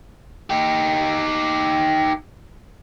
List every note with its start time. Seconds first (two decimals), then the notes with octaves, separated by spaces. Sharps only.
0.50 D#4 G4